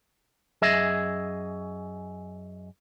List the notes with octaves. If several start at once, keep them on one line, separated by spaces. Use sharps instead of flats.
F#2 G#4 D#5 E5